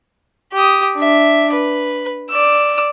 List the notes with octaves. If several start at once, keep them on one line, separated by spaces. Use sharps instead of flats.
G4 D#6
D4 E5
B4
D5 E6